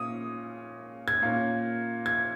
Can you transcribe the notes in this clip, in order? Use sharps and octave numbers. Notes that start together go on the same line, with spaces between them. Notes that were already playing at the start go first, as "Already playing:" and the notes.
Already playing: A#2 A#3 C#4 D#6
G#6
A#2 A#3 C#4
G#6